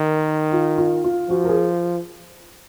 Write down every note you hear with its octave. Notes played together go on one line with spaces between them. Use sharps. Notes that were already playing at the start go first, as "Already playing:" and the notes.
Already playing: D#3 A#4
F4
F4
F4
F3 F#4
A#4
G#4